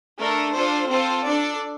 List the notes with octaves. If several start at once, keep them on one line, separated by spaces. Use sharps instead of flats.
A3 D4 A4 A#4
D4 F4 A4 C5
C4 F4 A4 C5
D4 A4 D5